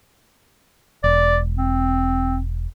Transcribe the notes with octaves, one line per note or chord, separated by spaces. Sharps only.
E1 D5
C4